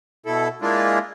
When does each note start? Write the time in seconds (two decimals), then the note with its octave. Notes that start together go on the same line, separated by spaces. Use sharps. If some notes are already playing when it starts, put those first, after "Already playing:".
0.26 B2 E4 A4
0.62 G#3 A#3 D4 E4 F4